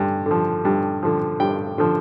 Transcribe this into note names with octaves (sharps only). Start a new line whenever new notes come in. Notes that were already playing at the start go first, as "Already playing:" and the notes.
Already playing: G2 D3
D3 F3
G2
D3 F3
G2 G5
D3 F3